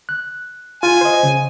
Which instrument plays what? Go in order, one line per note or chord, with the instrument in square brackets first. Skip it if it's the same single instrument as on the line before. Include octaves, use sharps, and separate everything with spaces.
[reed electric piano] F#6
[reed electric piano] F4 [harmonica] G#5
[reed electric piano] C5 D#5
C#3